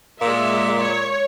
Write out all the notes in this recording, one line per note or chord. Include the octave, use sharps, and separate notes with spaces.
A#2 G#3 A#3 E5
C#5